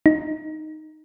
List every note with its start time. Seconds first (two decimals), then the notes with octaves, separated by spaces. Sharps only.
0.06 D#4